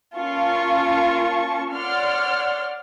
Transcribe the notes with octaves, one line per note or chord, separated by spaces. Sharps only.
A#3 C#4 F4 A5 C#6
C#5 D5 F#5 C6 F6